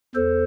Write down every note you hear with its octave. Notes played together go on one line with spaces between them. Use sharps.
E2 A4 C5